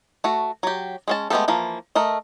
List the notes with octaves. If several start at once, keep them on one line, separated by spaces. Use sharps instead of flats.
A3 F#4
F#3 G4
G#3 C#4 A5
G#3 A3 B3 G4 A4
E3 F3 A#3
A3 A#4 D#5